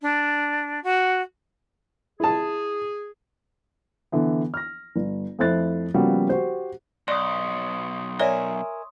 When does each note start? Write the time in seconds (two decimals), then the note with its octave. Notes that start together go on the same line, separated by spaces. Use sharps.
0.01 D4
0.83 F#4
2.20 E4 G#4 A5
4.12 D3 E3 B3
4.54 F6 A#6
4.96 G1
5.39 F2 A3 E4 C5 F#6 A6
5.94 C#3 F3 G3 A#3 B3 F#4
6.29 F#4 G4 C5
7.08 B1 D5 C6 C#6 D#6
8.19 A#4 C#5 D5 E5 G#5